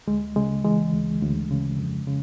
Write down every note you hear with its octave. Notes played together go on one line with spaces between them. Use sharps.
D2 G#3
C#3 G#3
E3 G#3
D2
D2
C#3
F2
C#3